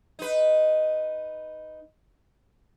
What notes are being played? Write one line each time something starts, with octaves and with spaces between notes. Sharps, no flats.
D#4 B4